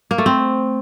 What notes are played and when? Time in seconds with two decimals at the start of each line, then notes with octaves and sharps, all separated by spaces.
0.11 A#3
0.18 A3
0.26 C4